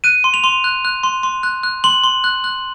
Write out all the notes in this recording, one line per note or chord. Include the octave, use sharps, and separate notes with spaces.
F#6 D#7
C6
F7
C6
F#6
F#6
C6
C6
F#6
F#6
C6 F#7
C6
F#6
F#6